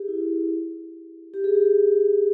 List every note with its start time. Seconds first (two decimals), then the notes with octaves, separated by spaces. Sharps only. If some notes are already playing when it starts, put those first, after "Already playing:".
Already playing: G4 G#4
0.08 E4
1.34 G4
1.44 G#4
1.55 G4